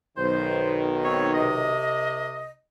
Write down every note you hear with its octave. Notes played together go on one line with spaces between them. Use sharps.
B1 D#3 C5
C4 C#5
C2 C3 D#5